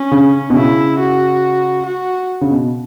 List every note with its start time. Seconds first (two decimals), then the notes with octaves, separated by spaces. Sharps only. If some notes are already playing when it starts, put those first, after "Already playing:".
Already playing: C#4
0.12 C#3
0.50 B2
0.55 C#3 E4
0.99 F#4
1.86 F#4
2.41 C#3
2.51 B2